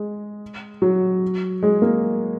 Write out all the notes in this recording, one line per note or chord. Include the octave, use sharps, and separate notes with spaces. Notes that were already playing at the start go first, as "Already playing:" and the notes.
Already playing: G#3
F#3
G#3
A#3